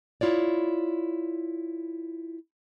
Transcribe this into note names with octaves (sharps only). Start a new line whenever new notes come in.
E4 F4 C#5 D5